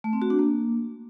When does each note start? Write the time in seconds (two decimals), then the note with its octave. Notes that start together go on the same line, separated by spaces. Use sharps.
0.04 A3
0.13 C4
0.22 F#4
0.30 D4
0.39 A#3